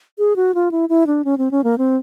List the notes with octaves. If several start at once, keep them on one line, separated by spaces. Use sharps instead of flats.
G#4
F#4
F4
E4
E4
D4
C#4
C4
C#4
A#3
C4